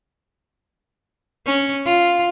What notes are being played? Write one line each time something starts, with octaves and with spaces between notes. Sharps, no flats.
C#4
F4